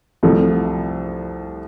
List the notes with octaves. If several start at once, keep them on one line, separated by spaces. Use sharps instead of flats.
C2 C3 F3 A3